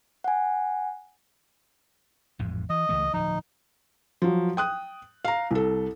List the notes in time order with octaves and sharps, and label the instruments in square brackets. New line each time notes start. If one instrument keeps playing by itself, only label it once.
[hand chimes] F#5 G#5
[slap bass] A1 F2 G#2
[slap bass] E3 [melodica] D#5
[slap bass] C#2 E3 A3
[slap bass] D1 F3 [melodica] D#4
[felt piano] F3 F#3
G5 D#6 F#6
F5 A#5
C2 A4